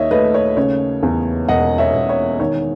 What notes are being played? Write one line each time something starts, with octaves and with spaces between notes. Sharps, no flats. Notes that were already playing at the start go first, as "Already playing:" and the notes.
Already playing: D#2 C#5 D#5 E5
A3 B4 D#5
C#5
C#3 C#5
E2
E1 D#5 F#5
C#5 E5
E1
C#5
D#3 C#5